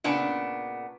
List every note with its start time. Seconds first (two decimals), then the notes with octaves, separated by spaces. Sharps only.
0.04 A#2 C#3 B3 D4